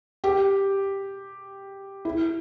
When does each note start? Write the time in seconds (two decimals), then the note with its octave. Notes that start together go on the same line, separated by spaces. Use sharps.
0.24 G4
2.05 E4